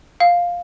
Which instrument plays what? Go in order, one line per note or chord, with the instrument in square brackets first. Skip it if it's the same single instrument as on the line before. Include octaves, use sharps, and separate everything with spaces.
[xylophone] F5